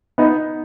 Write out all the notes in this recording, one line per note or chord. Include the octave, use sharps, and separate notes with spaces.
B3 D#4